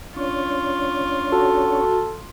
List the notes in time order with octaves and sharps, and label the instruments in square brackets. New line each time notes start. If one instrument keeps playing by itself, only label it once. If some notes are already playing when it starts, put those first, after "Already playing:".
[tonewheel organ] C#4 D4 C#5 [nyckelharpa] F4
[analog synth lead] F#4 [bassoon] A4